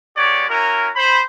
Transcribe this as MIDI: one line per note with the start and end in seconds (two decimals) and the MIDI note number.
0.17 0.47 56
0.17 0.47 59
0.17 0.47 67
0.17 0.47 73
0.17 0.47 74
0.49 0.87 61
0.49 0.87 64
0.49 0.87 66
0.49 0.87 70
0.96 1.20 72
0.96 1.20 83